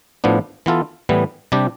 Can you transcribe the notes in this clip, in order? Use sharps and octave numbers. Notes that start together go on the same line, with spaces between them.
A2 F3 B3 D4
E3 B3 F4 A4
A2 E3 G3 B3
C3 G3 D4 G4